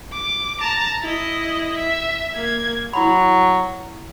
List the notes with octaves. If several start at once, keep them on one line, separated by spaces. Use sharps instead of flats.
D6
A5 A#5
E4 D#5
E5
A#3 G#6
F#3 E4 B5